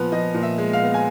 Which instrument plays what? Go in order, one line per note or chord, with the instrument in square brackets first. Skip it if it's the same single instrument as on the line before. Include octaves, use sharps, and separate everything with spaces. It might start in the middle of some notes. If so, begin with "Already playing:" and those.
Already playing: [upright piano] A#2 F3 B3 B4
F3 D#5
A#2
E5
G#3
F5
B3
G#5